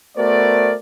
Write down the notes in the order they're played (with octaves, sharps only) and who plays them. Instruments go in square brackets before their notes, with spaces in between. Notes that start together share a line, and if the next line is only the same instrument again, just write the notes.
[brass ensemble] A3 B3 F#4 A#4 C5 D5